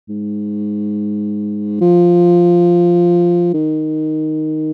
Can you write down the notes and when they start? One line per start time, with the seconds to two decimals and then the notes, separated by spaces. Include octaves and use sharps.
0.09 G#2
1.81 F3
3.54 D#3